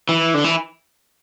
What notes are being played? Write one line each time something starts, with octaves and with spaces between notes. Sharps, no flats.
E3
D3
E3